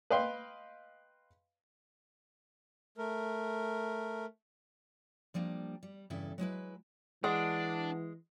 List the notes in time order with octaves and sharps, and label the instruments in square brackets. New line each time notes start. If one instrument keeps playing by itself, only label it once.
[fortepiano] B4 D#5 F5 G5 C6
[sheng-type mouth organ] A3 A#4
[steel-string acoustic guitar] F3 G3 A#3 D4
G3
E2 G2 C#3 E4 A4 E5
F#3 G#3 E4 B4
[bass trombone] E3 [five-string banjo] G#3 [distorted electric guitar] D4 [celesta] F#5